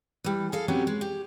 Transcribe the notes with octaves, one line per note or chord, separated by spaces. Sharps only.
E3 G3
G#4 A4 F5
C3 F#3 B3 C#4 G4
G#3
G4